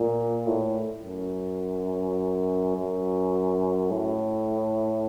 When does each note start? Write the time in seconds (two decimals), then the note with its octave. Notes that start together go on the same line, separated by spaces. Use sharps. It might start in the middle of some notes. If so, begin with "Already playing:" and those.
Already playing: A#2
0.47 A2
1.04 F#2
2.76 F#2
3.91 A2